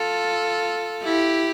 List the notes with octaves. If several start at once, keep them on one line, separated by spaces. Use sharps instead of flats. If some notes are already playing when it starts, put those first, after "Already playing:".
Already playing: F4 A4
E4 G4